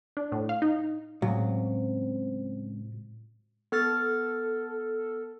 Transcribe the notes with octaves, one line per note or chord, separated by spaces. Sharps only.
D4
A2
F5
D#4
C#2 A2 F#3 C4
B3 A4 F6 A6